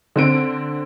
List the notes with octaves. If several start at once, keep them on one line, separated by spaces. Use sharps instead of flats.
D3 C4 D7